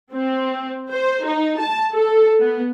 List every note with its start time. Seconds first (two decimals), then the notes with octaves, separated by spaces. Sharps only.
0.13 C4
0.91 C5
1.27 D#4
1.60 A5
1.93 A4
2.41 B3